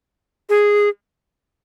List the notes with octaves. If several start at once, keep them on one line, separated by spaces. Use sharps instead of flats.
G#4